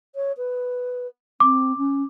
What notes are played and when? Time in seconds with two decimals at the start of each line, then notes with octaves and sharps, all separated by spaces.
0.15 C#5
0.37 B4
1.40 C4 D6
1.77 C#4